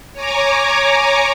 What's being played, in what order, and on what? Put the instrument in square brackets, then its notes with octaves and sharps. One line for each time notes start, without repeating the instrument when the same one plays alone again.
[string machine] C#5 G#5 A#5 D6